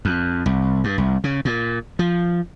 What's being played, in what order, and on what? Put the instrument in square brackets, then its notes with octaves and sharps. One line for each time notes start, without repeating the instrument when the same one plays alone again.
[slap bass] F2
C2
G2
C2
C#3
A#2
F3